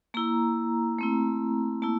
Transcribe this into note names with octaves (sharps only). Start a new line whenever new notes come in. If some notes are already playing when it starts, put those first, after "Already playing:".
A#3 E4 A#5
A3 C4 E4
A#3 E4 A5